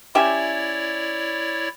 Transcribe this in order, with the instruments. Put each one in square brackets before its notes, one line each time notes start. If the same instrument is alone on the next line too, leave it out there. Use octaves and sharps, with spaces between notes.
[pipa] C#4 G4 E5 [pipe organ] E4 C#5 D5